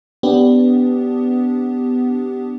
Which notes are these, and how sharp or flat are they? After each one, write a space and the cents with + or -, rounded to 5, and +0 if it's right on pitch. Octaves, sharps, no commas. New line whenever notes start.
B3 +15 D4 -5 G4 +0